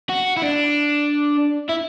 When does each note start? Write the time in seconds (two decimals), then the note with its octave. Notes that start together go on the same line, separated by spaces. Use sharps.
0.09 F#4
0.37 E4
0.42 D4
1.69 E4